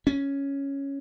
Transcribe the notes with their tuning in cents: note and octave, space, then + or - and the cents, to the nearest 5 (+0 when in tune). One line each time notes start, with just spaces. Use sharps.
C#4 +0